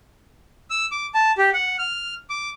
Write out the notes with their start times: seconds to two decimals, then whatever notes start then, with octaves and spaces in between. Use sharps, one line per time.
0.70 E6
0.92 D6
1.14 A5
1.38 G4
1.53 F#5
1.79 F6
2.30 D6